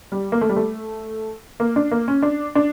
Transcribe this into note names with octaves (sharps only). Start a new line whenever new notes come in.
G3
A#3
A3
G3
A3
A#3
D4
A#3
C#4
D4
D4